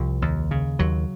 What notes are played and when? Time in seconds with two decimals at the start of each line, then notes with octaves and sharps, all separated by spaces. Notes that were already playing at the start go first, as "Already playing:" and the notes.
Already playing: C2 C3 F3
0.22 D#2
0.51 C#3
0.79 D#2 F#3